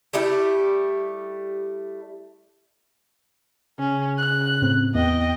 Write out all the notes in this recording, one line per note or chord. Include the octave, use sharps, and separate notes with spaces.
G3 A3 E4 G4
C#3 C#4
F#6
A2 C4
E2 B3 D#5 G5